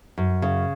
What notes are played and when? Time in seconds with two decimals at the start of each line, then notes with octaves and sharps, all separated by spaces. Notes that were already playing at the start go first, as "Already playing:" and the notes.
0.18 F#2
0.42 C#3